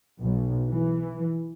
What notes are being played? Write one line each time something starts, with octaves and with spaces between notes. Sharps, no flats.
B1
E3